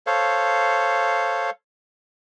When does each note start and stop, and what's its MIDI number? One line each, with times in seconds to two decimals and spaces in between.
0.07 1.50 69
0.07 1.50 72
0.07 1.50 73
0.07 1.50 77